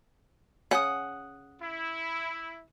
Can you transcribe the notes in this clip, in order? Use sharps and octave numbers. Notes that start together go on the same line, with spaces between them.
C#3 C#4 F#5 D#6
E4